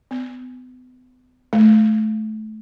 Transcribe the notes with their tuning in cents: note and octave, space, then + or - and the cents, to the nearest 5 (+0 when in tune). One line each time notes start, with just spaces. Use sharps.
B3 +35
A3 -25